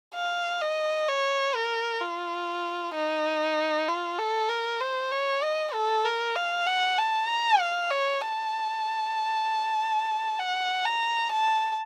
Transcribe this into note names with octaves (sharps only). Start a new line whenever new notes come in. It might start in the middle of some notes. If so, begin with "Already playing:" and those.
F5
D#5
C#5
A#4
F4
D#4
F4
A4
A#4
C5
C#5
D#5
A4
A#4
F5
F#5
A5
A#5
F5
C#5
A5
F#5
A#5
A5